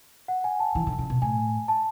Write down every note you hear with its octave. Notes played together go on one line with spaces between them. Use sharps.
F#5
G#5
A5
E3
D3
C#3
B2
A2 G#5
A5